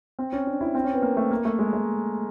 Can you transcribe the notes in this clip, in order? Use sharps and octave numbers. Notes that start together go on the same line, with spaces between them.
C4
C#4
D4
E4
C4
C#4
B3
A#3
A3
A#3
A3
G#3
G#3